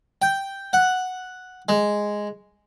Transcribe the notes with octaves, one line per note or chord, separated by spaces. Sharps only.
G5
F#5
G#3